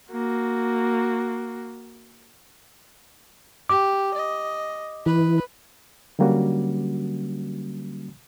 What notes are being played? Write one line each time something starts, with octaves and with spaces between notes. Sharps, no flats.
A#3 F#4
G4 D6
D#5
E3 B4
D3 F#3 G3 A#3 C#4 F#4